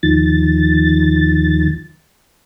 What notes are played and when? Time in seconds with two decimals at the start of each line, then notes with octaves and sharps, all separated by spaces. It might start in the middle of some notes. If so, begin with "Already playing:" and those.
0.03 D#2 D#3 F3 A6